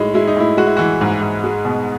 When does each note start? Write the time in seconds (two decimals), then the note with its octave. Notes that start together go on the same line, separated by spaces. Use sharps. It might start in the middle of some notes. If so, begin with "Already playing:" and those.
Already playing: A2 G#3 D#4
0.14 G#3 E4
0.27 D#4
0.37 A2 E4
0.57 G#3 F#4
0.67 E4
0.77 E3 F#4
1.01 G#2
1.21 G#2
1.44 G#3
1.65 B2